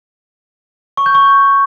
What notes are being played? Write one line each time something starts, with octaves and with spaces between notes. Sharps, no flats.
C#6
G6
C#6